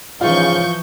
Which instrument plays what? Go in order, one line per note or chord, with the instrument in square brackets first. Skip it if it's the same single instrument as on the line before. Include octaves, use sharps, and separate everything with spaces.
[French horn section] G#2 C#3 [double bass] E3 F3 [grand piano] F4 [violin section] C#6 G6